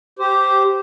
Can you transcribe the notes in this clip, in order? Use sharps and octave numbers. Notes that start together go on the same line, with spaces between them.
G4 C5